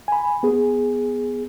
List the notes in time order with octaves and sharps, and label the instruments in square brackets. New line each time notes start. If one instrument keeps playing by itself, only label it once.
[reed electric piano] G#5 B5
B3 G#4